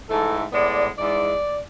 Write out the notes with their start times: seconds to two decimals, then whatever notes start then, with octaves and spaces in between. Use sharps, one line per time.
0.08 G#2 E3 A3 A4
0.52 A2 G#3 B3 D5
0.97 G#2 E3 G#3 D5